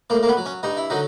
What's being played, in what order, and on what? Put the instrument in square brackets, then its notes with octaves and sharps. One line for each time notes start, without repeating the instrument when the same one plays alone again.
[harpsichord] A2 A#3
A#3
B3
F#3
C#4
G2 D#4
E4
D3 F#3 D#4